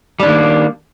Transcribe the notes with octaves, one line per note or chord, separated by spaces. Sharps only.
D#3 G3 A#3 D4